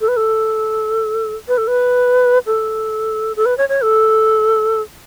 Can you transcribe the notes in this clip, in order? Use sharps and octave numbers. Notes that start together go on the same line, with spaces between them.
A4
B4
A4
B4
A4
B4
A4
A4
B4
C#5
C#5
A4